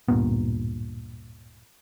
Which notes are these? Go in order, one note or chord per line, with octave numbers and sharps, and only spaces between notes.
D1 G2 A#2 B3